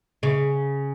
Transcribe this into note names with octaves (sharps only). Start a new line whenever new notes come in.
C#3